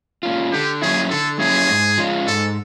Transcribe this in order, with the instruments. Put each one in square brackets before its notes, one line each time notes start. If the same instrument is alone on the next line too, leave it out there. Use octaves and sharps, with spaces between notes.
[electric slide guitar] A#3 C#4 F4
[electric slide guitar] D3 [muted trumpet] G4
[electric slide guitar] F#3 A#3 C#4 E4 [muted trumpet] G#4
[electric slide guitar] D3 [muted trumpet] A4
[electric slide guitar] F#3 A#3 C#4 E4 [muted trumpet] G#4
[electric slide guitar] G#2
F3 G#3 C#4 F4
[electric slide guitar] G#2 [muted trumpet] A4